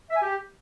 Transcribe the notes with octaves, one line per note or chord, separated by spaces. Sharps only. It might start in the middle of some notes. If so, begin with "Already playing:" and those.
E5
G#5
G4